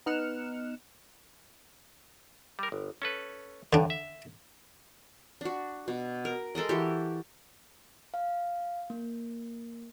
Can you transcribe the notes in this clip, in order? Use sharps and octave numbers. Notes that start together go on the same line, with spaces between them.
B3 D#4 F6 F#6 C#7 E7
G3 A#4
G1
C#4 A4 B4
B1 G2 D3 D4
E5
D4 F#4
B2
A#4
G#3 A4 A#4 D#5
E3 F#4 G4
F5
A#3